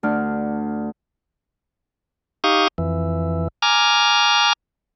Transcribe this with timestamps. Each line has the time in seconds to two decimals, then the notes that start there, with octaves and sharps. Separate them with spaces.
0.03 D2 D4 F6
2.44 D#4 G4 F5 C#6 D#6
2.78 F2 E3
3.62 G#5 A#5 D6 F6